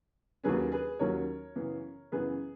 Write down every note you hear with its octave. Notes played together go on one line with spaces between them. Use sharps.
D#2 D#3 F#3 C#4 G#4 B4
G#4 B4
D#2 D#3 F#3 C#4 A#4 C#5
F#2 C#3 E3 B3
F#2 C#3 E3 B3 G#4 B4